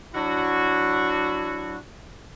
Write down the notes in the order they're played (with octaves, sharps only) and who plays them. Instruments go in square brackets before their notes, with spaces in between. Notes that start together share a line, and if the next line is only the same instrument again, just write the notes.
[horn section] F#3 D4 E4 F#4